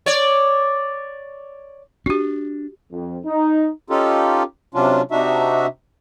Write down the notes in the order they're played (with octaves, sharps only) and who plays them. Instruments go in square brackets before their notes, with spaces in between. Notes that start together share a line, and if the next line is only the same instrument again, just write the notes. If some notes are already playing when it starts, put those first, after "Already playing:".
[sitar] C#5 D5
[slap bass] C#4 D4 [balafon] F#4 G4
[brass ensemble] F2
D#4
[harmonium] C#4 D#4 F4 G4 A4
C3 F#3 C#4 D4 F4
C3 D4 D#4 F#4 E5